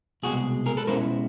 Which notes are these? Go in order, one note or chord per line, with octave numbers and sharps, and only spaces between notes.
C2 B2 G#3 F#4 G#4
G#4 A#4
A4 B4
B2 G#3 C#4 E4 A#4 C5